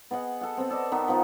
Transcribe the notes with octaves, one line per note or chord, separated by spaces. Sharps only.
B3 G#4 D#5 F#5
A4 F#5
B3 C4
A4 D5 D#5
D#3 B3 E5 G5
F3 B3 D#4 F4